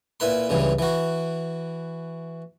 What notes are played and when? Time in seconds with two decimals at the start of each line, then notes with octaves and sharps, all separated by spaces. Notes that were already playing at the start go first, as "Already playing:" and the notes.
0.20 A#2 E4 B4 C6
0.49 C#2 G2 C#3 E3
0.79 E3 F#4